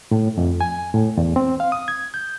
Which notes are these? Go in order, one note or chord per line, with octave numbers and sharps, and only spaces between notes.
A2
F2
G#5
A2
E2
C4
F5
D#6
G#6
G6